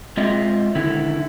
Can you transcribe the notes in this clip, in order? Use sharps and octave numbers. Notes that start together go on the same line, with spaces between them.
G#3 C4 F4 D#5 E5
D3 D#3 E4